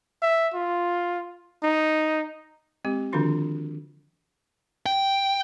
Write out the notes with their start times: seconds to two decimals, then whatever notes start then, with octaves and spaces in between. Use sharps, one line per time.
0.22 E5
0.54 F4
1.63 D#4
2.85 G#3 C4 G4
3.12 D3 D#3 F3 D4 F4 F#4
4.86 G5